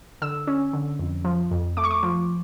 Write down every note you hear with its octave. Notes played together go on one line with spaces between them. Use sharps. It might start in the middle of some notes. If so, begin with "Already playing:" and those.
D3 E6
C#4
D3
F2
F3
F2
A3 D6
C#6
D6
F3